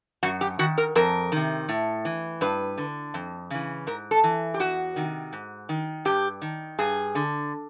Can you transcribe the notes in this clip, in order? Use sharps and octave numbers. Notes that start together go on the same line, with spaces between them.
F#2 F#4
G4
D#3 F#4
A#4
F2 A#4
C3 D#3
A2
E3
G2 B4
D3
F2
C#3 E3
G#2 A#4
A4
E3
G4
E2 F#4
C3 D#3
G#2
D#3
G2 G4
D#3
G2 G#4
D3